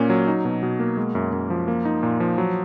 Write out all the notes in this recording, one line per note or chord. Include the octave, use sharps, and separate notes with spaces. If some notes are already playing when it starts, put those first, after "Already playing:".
Already playing: A#2 A#3 C#4
F#3
D#4
B2
B2
A#3
G#3
F#2
F#2
F3
A#3
D#4
A#2
F3
F#3